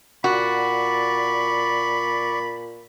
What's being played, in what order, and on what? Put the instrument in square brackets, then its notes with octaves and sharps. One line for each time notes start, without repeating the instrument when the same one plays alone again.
[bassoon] A#2 [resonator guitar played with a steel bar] F#4 [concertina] D5 C#6 [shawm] B5